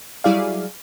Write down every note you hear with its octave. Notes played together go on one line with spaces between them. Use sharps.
F#3 G3 E4 G#4 D5 F5